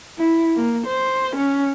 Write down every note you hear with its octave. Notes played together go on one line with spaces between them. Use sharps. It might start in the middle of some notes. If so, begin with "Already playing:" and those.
E4
A#3
C5
C#4